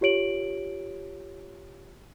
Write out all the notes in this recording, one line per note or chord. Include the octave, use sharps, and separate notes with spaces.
F4 G4 C#5 D7 F#7